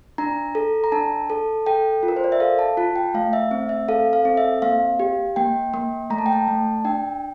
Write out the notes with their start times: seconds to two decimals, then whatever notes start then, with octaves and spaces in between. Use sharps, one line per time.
0.18 D4 A#5
0.55 A4
0.84 A#5
0.92 D4 A5
1.30 A4
1.66 A4 G5
2.03 F4
2.08 A#4
2.16 C5
2.24 D5
2.32 E5
2.40 A4 F5
2.59 A5
2.77 F4 A5
2.96 G5
3.14 A3 F5
3.33 E5
3.51 C4
3.69 E5
3.89 A4 F5
4.13 F5
4.25 C4
4.37 E5
4.62 A#3 F5
4.99 G4
5.36 A#3 G5
5.74 A#3
6.10 A3 A#5
6.18 A5
6.26 G5
6.33 A5
6.48 A3
6.85 D4 G5